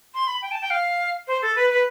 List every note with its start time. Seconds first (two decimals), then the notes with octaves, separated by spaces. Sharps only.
0.14 C6
0.27 B5
0.42 G5
0.52 A5
0.61 G5
0.70 F5
1.28 C5
1.42 A4
1.56 B4
1.70 B4